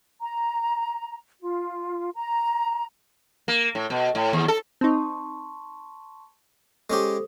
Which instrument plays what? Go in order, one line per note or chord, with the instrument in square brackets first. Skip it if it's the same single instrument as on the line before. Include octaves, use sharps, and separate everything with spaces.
[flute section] A#5
F4
A#5
[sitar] A#3
A2
B2
A2
D#2
A4
[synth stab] C4 D#4 [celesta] A5 C6 C#6
[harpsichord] G#3 C#4 G4 [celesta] A4 C5 D#6